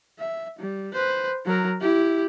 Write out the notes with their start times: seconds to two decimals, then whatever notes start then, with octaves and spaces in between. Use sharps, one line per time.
0.19 E5
0.59 G3
0.93 B4 C5
1.45 F#3 A#4
1.81 E4 G4